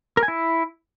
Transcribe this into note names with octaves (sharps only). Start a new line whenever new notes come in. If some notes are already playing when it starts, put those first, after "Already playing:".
A#4
G#5
E4